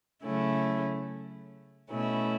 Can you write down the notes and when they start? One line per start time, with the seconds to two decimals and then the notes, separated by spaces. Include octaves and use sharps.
0.22 C#3 F#3 A3 C#4 E4
1.90 B2 A3 C#4 E4